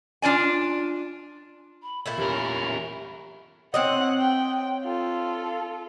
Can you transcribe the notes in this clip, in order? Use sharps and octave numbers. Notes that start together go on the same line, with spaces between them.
D4 F4 D5 G#5
B5
A#2 A3 E4 B5
E2 C#4 G4 A#4
C4 C#5 D#5 F#5 F#6
G5
F4 A4